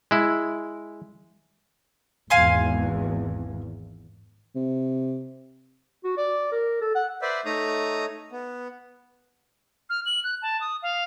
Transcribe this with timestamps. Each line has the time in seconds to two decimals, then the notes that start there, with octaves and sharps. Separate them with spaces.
0.11 G#3 E4
2.30 G#1 E2 F5 G#5 C6
4.56 C3
6.04 F#4
6.17 D5
6.52 A#4
6.82 A4
6.95 F#5
7.22 B4 C5 D5 E5
7.45 A3 D#4 C#5 A#5 D#6
8.32 B3
9.90 F6
10.06 F#7
10.24 F#6
10.42 A5
10.61 D#6
10.83 F5